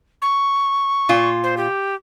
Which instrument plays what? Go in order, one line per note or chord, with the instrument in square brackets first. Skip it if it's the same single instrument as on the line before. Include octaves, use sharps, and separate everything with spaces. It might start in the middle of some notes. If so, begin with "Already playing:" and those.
[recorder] C#6
[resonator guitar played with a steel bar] A#2 F4
[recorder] C5
G4